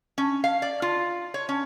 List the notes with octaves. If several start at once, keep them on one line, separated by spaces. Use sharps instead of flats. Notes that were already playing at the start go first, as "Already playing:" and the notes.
C#4
F5
D5
F4
C#5
C#4